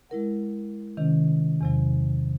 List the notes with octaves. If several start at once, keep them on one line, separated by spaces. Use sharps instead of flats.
G#3 E4 A#4 F#5
C3 D#3 C#4
E2 C3 F#3